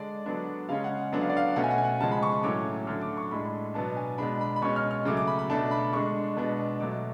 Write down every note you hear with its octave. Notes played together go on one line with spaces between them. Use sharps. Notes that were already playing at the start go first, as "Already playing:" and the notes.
Already playing: D3 G#3 D4 D5
D3 F#3 B3 D4
C#3 G#3 C#4 F5
F#5
D3 F#3 B3 D4 F#5
F5
D5
F5
B2 A3 C#4 F#5
G#5
F#5
G#5
F#5
C#3 F3 G#3 A5
B5
C#6
A2 F#3 A3 C#4 D6
D3 F#3 A3 F6
D6
C#6
A2 G#3 D4 B5
B2 F#3 B3 D4 A5
G#5
B2 G#3 D4 B5
B5
B5
B2 G#3 C#4 C#6
F6
F6
C#3 F#3 A3 D6
D6
B5
B5
B2 A3 D4 A5
B5
D3 G#3 D4 C#6
B2 G#3 B3 D4
B2 F#3 A3 D6
D6